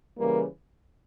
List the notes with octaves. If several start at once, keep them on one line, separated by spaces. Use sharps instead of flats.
C#3 E3 G3 A#3